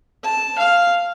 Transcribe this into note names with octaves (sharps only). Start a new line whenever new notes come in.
A5
F5